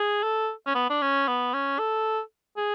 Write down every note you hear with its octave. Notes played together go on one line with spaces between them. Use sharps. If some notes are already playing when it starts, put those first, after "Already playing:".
Already playing: G#4
A4
C#4
B3
D4
C#4
B3
C#4
A4
G#4